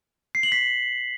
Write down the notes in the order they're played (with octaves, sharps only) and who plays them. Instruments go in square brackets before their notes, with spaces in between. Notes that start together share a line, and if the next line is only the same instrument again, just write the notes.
[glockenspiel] C7
F#7
B6